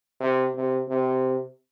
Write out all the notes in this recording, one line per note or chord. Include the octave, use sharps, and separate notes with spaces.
C3
C3
C3